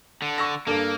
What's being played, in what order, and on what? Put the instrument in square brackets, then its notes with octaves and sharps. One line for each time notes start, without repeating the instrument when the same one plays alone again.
[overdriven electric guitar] D3
[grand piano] C#6 E6 A#6
[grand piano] G2 A4 [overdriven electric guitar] A#3